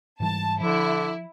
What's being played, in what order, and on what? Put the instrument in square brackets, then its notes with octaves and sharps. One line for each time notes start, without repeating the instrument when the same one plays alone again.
[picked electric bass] G#2 E3 G3 [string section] A5
[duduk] D3 [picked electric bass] F3 [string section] E4